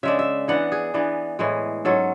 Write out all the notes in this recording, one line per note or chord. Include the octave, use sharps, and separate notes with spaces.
C#3 G#3 D4 E5
E5
E3 B3 D4 F#5
G#4
E3 B3 D4
A2 E3 G#3
G#2 F#3 C#4 A4